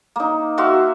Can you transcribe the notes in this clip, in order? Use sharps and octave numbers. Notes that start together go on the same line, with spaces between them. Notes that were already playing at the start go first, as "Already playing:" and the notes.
A#3 D#4
F#4 E5 F5 C6